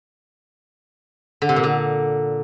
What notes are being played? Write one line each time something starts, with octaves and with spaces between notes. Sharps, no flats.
D3
C3
A#2
D3